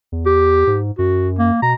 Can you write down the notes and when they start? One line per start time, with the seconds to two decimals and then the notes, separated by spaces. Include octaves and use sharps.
0.12 E2
0.26 G4
0.67 G#2
0.99 F#2 F#4
1.39 A#3
1.62 B2 A#5